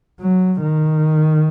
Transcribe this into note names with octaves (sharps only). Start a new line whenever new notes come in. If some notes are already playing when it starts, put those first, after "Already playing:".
F#3
D#3